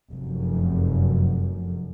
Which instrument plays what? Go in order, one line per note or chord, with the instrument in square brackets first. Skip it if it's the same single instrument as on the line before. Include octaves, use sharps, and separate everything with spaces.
[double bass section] F1 F#2